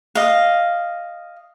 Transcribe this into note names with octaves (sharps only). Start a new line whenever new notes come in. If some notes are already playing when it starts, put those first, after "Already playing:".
D#5 F5